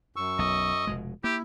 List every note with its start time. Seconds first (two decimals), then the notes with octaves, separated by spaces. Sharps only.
0.16 F#2 C#6 E6
0.39 B1 D#5
0.87 F1 B2 G#3
1.24 A#3 E4 G4